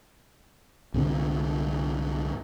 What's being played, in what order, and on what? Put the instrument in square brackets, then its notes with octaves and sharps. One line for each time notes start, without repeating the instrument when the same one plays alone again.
[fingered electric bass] C2 G#2 D3 B3